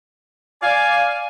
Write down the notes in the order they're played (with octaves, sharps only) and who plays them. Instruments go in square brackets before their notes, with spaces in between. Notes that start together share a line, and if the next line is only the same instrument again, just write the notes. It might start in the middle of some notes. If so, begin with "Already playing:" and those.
[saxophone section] D5 F5 [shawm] G#5